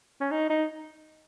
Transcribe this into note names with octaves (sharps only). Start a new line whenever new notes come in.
C#4
D#4
D#4